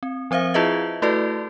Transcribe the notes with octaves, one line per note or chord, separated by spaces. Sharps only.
C4
F3 C4 C5 E5 F5
E4 F4 G#4 B4 D#5 E5
A3 E4 F#4 A4 B4 D5